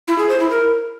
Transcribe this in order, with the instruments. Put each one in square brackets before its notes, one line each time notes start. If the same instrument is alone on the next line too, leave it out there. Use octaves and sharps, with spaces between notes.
[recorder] E4
G#4
C5
E4
A#4